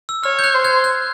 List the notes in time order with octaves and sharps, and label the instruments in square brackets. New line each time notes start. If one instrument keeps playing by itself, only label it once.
[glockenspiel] E6
[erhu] C#5 [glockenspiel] F6
[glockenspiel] G6
F#6
[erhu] C5
[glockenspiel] F#6 G#6
F#6